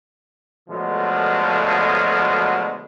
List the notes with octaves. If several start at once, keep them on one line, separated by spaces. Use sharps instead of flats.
B2 D3 F3 F#3 G#3 A3